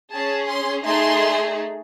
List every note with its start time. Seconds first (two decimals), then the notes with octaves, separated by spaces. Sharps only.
0.11 C#4 G#4 A5
0.48 C6
0.85 A3 D#4 G#4 C6